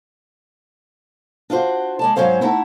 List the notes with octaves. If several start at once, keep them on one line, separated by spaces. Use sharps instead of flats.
D4 F4 F#4 C5
G#3 D5 A5
G#2 C3 F#3 C#4 C5 F5
A3 D#4 E4 E5 F#5 A5